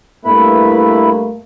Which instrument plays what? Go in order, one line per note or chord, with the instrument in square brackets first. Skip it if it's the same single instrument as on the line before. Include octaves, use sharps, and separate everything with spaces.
[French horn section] G2 A3 A#3 [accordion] E4 B4 B5